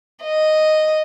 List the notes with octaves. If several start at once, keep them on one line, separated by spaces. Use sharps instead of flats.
D#5